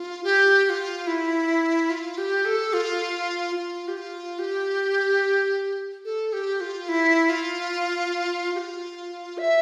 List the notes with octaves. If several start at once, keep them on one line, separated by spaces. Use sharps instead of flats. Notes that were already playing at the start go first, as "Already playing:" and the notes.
Already playing: F4
G4
G4
F4
E4
F4
G4
A4
F4
F4
G4
F4
G4
A4
G4
F4
E4
F4
G4
F4
E5